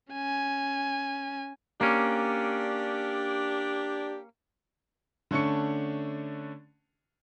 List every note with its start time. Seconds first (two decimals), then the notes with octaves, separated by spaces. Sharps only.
0.12 C#4 G#5
1.81 A#3 C#4 D4 G4
5.31 D3 A3 C#4 D4 C#6 C#7